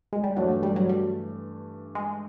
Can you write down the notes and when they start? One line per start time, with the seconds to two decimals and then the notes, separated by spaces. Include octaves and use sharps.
0.13 G#3
0.23 G3
0.36 G2 E3 F#3 A3 D4
0.63 G3
0.76 F#3
0.89 G3
1.95 G#3